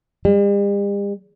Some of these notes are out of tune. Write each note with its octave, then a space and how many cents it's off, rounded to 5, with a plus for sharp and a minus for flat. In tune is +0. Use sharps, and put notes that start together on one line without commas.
G3 +45